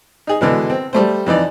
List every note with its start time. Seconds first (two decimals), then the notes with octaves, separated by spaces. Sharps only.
0.27 D#4 G#4
0.41 B2 D3 E3 G#3
0.70 C4
0.93 G3 A3 C5
1.26 F2 E3 D#4 D5